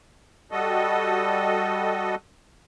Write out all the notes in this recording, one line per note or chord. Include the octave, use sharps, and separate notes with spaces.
G3 F#4 A4 D#5